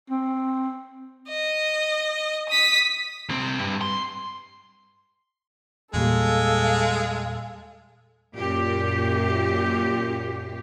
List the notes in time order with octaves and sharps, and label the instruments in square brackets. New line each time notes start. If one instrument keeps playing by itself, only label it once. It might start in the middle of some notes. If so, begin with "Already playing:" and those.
[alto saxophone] C4
[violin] D#5
D#6 B6
[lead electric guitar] C2 C4
G2
C6
[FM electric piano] E2 A#2 G3 [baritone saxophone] G#3 [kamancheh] A4 F5
[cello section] F#2 A#2 G4